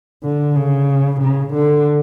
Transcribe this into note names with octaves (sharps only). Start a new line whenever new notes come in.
D3
C#3
C#3
D3